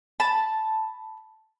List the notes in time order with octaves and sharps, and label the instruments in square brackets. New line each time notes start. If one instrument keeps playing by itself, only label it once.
[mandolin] A5 B5